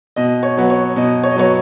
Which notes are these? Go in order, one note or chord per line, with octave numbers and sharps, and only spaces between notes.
B2 D#5
C#5
F#3 B3
C#5
B2 D#5
C#5
D#5
F#3 B3 C#5